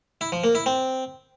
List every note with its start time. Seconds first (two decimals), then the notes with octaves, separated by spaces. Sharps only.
0.21 E4
0.32 F3
0.44 A#3
0.55 E4
0.66 C4